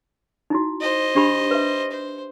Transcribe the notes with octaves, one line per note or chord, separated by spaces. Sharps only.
D#4 E4 F#4
C5 D#5
D4 G4 B5
B4 E5
C5